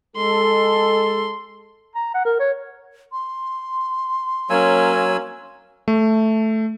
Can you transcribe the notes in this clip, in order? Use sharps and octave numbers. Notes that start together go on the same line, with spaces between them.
G#3 A4 C6
A#5
F#5
A#4
C#5
C6
F#3 A#3 C#4 G#5 E6
A3